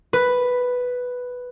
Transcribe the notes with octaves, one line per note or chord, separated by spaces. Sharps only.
B4